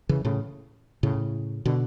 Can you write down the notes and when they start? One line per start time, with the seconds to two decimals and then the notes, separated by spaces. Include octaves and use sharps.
0.09 C#3 E3
0.25 A2 C#3
1.03 A2 C#3
1.65 B2 D3